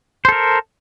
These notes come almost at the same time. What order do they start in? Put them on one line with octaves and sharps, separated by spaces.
C5 A4 A#4